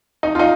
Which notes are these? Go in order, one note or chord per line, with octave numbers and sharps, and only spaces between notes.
D#4
F4
D#4